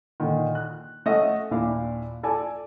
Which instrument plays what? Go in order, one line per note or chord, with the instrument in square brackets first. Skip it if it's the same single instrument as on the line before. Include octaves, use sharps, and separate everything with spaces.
[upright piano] A#2 D3 D#3
F#6
A3 C#4 C#5 D#5 E5 F#5
D#2 A#2 D4 E4 E5 F5
A4 D5 G#5 A5